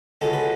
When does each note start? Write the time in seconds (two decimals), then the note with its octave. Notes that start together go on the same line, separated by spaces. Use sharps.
0.21 C#2 B2 G#3 C#4 A4
0.33 B4